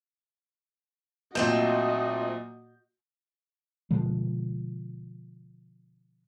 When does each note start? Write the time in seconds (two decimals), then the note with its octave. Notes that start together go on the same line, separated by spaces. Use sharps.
1.35 A#2 F#3 A3 C4 D#4 F#4 D#5 G6
3.91 B2 D3 F3 G#3